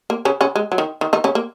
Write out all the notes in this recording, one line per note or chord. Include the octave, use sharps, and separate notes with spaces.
A#3
C#3 C#4
C#3 C#4
G#3
F#3
D#3
D#3
D#3 D#4
C#3 C#4
A#3